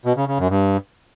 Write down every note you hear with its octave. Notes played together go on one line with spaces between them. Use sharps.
B2
C#3
C#3
F#2
G2